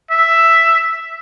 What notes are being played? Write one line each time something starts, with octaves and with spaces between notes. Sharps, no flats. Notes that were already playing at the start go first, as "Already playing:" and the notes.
E5